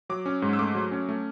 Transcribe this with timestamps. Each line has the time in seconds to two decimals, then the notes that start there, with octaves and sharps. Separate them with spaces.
0.09 F#3 D6
0.26 C#4
0.42 G#2
0.53 E6
0.59 A3 D6
0.75 F#3
0.91 C#4
1.09 A3